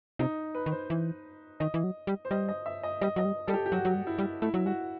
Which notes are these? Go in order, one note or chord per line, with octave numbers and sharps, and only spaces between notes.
C3 D#4
B4
D#3
C5
E3
D#3 D#5
E3
F#3
G3
C5
G3 D#5
D#5
E5
D#5
G3 D#5
F#3 D#5
G3
G3 A4
G4
G4
F#3 F#4
F#3
G3
E4
G3
A3 E4
F#3 E4
G3 F#4